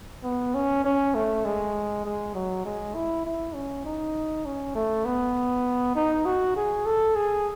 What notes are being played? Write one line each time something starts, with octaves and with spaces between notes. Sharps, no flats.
B3
C#4
C#4
A3
G#3
G#3
F#3
G#3
E4
E4
C#4
D#4
C#4
A3
B3
D#4
F#4
G#4
A4
G#4